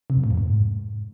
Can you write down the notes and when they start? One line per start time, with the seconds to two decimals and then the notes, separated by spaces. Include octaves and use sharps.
0.10 C3
0.17 F#2
0.24 A2
0.31 F2
0.38 G#2